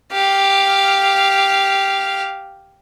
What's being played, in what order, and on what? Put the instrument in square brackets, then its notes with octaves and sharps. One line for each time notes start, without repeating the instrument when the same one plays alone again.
[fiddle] G4 F5